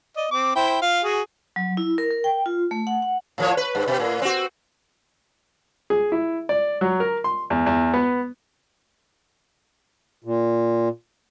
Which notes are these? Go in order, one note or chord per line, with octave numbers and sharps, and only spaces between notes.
D5 D#5
C4 D6
E4 C5 G5
F4 F5
F#4 G#4
F#3
E4
A#4
A#4
G5
F4
A3
F#5
F#5
A2 F3 C#5
B4
G2
B2
A2
C4 F#4
G#4
E4
D5
F#3
A#4
C6
E2
E2
B3
A#2